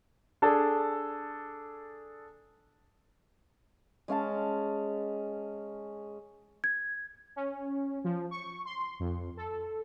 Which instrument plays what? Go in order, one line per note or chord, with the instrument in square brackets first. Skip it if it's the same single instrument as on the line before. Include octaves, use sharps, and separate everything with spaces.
[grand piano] D4 G#4 A4
[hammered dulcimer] G#3 C#4 F5 A5
[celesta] G#6
[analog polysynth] C#4
F3
C#6
C6
F2
A4